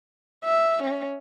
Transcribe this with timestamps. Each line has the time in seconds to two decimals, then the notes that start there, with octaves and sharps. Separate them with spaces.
0.44 E5
0.83 C#4